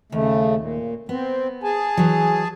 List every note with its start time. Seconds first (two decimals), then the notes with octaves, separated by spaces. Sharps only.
0.12 D#2 C#3 A3
0.56 A#2
1.09 B3 C4
1.63 G#4 G#5 A5
1.97 E3 F#3